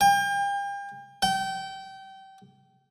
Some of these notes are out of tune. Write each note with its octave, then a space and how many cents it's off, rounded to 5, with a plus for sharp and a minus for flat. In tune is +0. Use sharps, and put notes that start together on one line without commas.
G5 +40
G5 -25